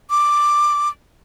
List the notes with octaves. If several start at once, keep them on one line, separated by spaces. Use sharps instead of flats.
D6